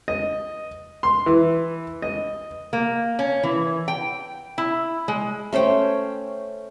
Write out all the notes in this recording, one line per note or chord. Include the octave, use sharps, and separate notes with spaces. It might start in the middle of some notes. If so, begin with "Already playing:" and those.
D#5
C6
E3
D#5
A#3
C#4
E3
G5
E4
G#3
A3 C#4 C5 G5